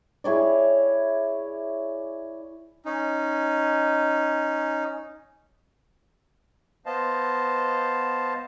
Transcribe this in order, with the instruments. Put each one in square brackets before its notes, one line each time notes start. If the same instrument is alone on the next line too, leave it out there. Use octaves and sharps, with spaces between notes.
[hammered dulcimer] E4 G#4 C#5 D5
[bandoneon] C#4 D#4
[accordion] B3 C5 D#5 F5 A5